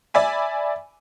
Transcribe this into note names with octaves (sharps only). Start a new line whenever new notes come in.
D5 E5 G#5 B5